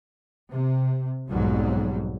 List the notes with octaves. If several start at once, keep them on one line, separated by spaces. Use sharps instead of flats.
C3
B1 F2 G#2 F#3 G3